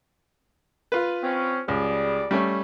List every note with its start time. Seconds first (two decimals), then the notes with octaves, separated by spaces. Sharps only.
0.92 F4 B4
1.23 C4 C#4
1.68 C#2 G3 G#4 D5
2.31 G3 A3 C#4